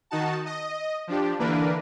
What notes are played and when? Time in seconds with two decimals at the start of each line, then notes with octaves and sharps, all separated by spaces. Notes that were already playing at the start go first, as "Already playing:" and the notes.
0.11 D#3 D#4 F#4 A5
0.46 D#5
1.07 F3 D4 G4
1.39 D3 E3 A#3 D4 A#4 B4